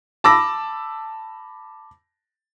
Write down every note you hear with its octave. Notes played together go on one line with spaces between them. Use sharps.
A5 B5 D6 E6 A#6